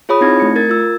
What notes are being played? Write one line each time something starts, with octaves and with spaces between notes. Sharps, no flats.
F4 G#4 C#5 B5 D#6
C4 D#4 E4 G#6 A#6
A3 C#7
A#4 G#6 A6
F4 E6